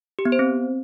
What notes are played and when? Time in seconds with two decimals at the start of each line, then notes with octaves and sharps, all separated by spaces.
0.19 G4
0.25 B3
0.32 C5
0.39 C4